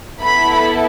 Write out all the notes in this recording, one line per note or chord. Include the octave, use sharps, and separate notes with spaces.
B3 E4 A4 B5